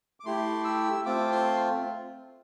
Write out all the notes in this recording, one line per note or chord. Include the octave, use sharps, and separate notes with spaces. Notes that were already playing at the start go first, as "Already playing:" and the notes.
D6
A3 E4 G4 C6
E6
A3 C4 F4 D6
C6